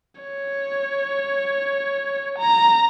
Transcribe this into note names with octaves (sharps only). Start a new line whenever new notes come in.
C#5
A#5